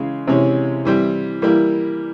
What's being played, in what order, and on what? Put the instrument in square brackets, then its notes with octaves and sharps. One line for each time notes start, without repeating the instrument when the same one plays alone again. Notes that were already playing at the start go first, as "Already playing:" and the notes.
Already playing: [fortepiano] C#3 E3 G#3
C3 E3 G#3 C#4 E4
E3 G3 C4 E4
E3 G3 A#3 E4